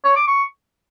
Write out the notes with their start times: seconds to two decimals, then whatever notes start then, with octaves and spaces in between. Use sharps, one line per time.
0.04 C#5
0.16 D6
0.28 C#6